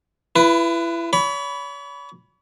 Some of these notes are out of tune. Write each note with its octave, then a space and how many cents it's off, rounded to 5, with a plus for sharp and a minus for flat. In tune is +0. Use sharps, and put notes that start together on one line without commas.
E4 +30 B4 +0
C#5 +40 B5 +0